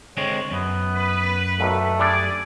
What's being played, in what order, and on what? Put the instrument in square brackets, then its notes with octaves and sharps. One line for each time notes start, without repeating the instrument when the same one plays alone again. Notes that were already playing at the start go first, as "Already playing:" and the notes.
[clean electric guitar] D3 G#3 C4 [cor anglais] C#5
[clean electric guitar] F#2 [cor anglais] B3
[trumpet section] B4
[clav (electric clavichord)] B1 A#2 [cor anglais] A3
[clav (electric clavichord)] G3 D4 A4 [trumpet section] G#4 D5